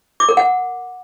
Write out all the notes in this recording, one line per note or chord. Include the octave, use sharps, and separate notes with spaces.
D6
A#4
F#5